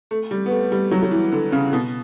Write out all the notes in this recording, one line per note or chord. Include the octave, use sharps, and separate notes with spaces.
A3
G3
B3
A3
G3
F#3
F#3
E3
D3
C#3
B2